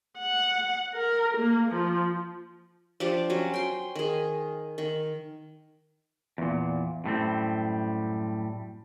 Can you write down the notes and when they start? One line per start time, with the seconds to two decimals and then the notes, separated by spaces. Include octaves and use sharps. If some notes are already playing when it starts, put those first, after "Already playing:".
0.19 F#5
0.94 A#4
1.37 A#3
1.71 F3
3.00 F3 D4 G4
3.30 F#3 C#4
3.54 G5 C6
3.95 D#3 G#4
4.78 D#3
6.38 E2 A#2
7.04 F#2 A2 G3 C4